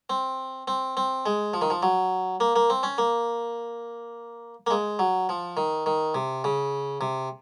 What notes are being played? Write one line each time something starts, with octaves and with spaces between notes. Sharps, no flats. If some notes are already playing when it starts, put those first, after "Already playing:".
C4
C4
C4
G#3
F3
D#3
F3
F#3
A#3
A#3
C4
C#4
A#3
A#3
G#3
F#3
F3
D#3
D#3
C3
C#3
C3